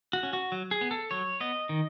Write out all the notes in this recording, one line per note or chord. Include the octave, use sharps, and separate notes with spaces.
F#4
C#4
F#4
F#3
G#4
B3
A4
F#3 C#5
B3 D#5
D#3